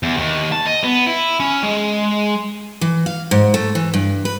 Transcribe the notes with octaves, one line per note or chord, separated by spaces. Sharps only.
E2
D#2
A5
D#5
B3
E4
C#4
G#3
E3
F5
G#2
A3
E3
G2
B4